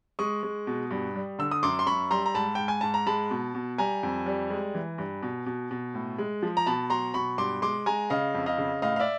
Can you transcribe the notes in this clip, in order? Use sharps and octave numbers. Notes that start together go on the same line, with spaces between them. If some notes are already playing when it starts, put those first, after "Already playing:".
G#3 C#6 D#6
G#3
B2
G2
G3
D3 E6
D#6
F#2 C6 D6
C6
F#2 B5 C#6
G3 A#5 C6
A#5
G#2 A5 B5
G#2 G5
G#5
G#2 A5
A#5
G#3 A5 B5
B2
B2
G3 G#5 A#5
F2
G3
G#3
E3
G2
B2
B2
B2
A2
G#3
F3
A#5
B2 A5 B5
F#3 A#5 C6
B2 B5 C#6
G2 C6 D6
G#3 C6 D6
G#3 G#5 A#5
C#3 D#5 F5
F2
D#5 F5
C#3
A2 D#5 F5
F5
D5 E5